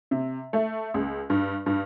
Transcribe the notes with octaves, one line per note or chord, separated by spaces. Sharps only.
C3
A3
C#2
G2
G2